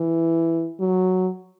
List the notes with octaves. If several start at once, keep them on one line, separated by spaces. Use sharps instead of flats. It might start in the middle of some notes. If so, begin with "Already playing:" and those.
Already playing: E3
F#3